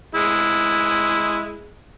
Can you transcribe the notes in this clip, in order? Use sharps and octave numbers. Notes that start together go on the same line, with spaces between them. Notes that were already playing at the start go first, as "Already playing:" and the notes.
G#3 E4